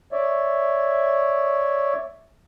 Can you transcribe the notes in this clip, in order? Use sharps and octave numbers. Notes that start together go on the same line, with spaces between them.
C#5 D5 E5